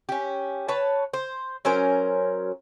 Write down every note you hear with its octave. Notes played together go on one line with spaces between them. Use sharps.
C#4 G4
B4 C#5 A5
C5
F#3 C#4 A#4 C5